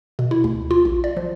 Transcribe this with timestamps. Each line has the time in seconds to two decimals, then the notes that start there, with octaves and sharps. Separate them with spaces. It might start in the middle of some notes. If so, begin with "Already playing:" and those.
0.19 B2
0.31 E4
0.44 D2
0.71 F4
0.85 A#1
1.04 D5
1.17 F3